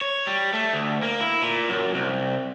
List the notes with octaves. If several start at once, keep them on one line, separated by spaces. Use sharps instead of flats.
C#5
G3
A3
D2
A#3
E4
A#2
F#2
C2